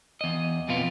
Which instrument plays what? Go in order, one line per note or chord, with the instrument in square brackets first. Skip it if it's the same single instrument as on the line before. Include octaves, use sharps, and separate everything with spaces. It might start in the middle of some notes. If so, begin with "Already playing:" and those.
[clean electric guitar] E2 D#5
F2 B2 B3 F4